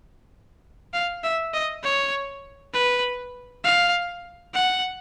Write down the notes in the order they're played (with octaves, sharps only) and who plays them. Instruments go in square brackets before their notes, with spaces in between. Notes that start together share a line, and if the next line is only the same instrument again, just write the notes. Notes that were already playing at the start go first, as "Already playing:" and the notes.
[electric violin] F5
E5
D#5
C#5
B4
F5
F#5